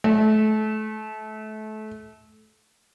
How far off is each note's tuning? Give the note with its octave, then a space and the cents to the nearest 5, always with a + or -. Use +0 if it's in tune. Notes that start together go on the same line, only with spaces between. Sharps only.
A3 -30